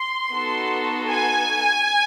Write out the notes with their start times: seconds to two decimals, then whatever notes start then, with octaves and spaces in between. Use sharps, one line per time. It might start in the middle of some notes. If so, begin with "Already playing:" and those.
Already playing: C6
0.31 B3 D#4 F#4 A4
1.12 G#5